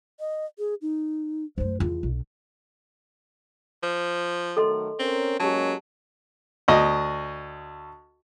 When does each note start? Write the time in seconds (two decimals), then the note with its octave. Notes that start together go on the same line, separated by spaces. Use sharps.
0.20 D#5
0.59 G#4
0.82 D#4
1.58 F#2 A3 C5
1.80 E2 F4
2.03 B1
3.83 F3
4.57 D#3 F#3 A3 A4 D#5 C6
4.99 C4 C#4 A#4
5.40 F#3 G#3 A#3 C#4 G4 A5
6.68 D2 D#5